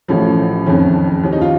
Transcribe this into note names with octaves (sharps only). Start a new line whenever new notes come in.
A1 A2 F3 C#4
F#1 F2 D#3 C#4
D#2 D#3 C#4
D#4
F4